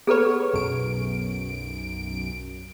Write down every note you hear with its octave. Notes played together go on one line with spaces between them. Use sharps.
B3 G#4 A4 B4 C#5
B1 F#2 D7